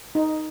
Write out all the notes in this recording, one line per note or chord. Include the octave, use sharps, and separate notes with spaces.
D#4